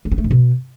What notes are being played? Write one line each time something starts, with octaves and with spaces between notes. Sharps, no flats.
A3
B3
A3
G#2
B2